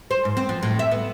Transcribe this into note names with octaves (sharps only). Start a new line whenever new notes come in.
C5
G#2
C4
F3
A2
E5
B3